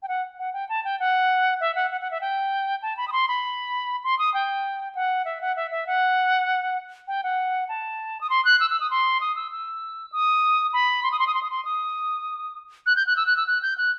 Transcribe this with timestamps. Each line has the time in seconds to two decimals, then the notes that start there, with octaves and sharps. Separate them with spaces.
0.03 G5
0.08 F#5
0.39 F#5
0.53 G5
0.69 A5
0.84 G5
1.00 F#5
1.60 E5
1.75 F#5
1.91 F#5
2.01 F#5
2.11 E5
2.21 G5
2.82 A5
2.97 B5
3.08 D#6
3.12 C6
3.28 B5
4.04 C6
4.19 D#6
4.34 G5
4.95 F#5
5.25 E5
5.41 F#5
5.56 E5
5.71 E5
5.87 F#5
7.08 G5
7.23 F#5
7.69 A5
8.21 D#6
8.30 C6
8.45 F#6
8.60 E6
8.70 E6
8.80 D#6
8.91 C6
9.21 D#6
9.36 E6
9.51 E6
10.12 D#6
10.73 B5
11.03 C6
11.12 D#6
11.19 C6
11.27 D#6
11.34 C6
11.43 D#6
11.50 C6
11.65 D#6
12.86 F#6
12.96 G6
13.07 F#6
13.17 E6
13.27 F#6
13.37 E6
13.47 F#6
13.62 G6
13.78 F#6